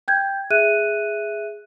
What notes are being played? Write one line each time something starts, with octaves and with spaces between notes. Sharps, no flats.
G5 G6 G#6
G#4 E5 F#6 D#7